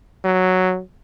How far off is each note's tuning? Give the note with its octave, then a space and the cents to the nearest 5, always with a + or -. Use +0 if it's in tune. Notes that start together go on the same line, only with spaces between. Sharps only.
F#3 +0